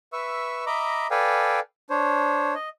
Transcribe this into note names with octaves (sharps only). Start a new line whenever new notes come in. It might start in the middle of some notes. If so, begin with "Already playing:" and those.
B4 E5 C#6 E6
D#5 E5 A#5 B5 D6
A4 B4 D5 F5 G5 G#5
D4 C5 C#5
D#5